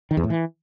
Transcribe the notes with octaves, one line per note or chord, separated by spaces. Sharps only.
D#3
E2
A2
E3